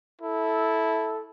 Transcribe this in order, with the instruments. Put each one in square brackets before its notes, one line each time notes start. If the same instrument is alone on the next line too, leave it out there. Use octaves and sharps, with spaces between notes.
[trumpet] E4 [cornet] A4